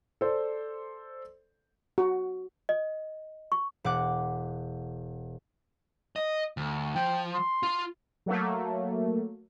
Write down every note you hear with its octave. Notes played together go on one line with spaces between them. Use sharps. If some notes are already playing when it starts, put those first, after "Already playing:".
A4 C5 D5
F#4
D#5
C#6
E1 F#5 D6 F#6
D#5
D2
F3 G5
C6
F4
F#3 A3 A#3